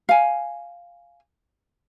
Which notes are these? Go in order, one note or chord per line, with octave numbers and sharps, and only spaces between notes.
F5 G#5